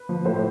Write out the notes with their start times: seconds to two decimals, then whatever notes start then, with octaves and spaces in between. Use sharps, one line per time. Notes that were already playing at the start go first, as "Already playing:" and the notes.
Already playing: B4
0.09 F3
0.25 A2 C5